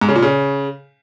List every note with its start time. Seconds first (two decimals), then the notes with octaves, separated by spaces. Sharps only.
0.01 G#2
0.08 C#3
0.15 A#2
0.22 C#3